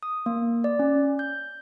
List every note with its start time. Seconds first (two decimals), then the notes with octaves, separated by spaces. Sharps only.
0.03 D#6
0.26 A#3
0.64 D5
0.79 C#4
1.19 G6